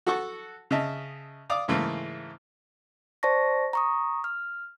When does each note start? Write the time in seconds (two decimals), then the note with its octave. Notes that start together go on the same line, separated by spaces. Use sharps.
0.07 F#4 A4 F#5 A5 C#6
0.71 C#3 D#5 E5 A5
1.50 D5 F5 D6 D#6
1.68 G#2 C#3 E3 A3 A#3
3.23 C5 D5 A5 C#6 A#6
3.73 A#5 C#6 D#6
4.24 F6